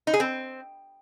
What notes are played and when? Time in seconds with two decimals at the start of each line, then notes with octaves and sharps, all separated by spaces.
0.07 D#4
0.13 G#4
0.20 C4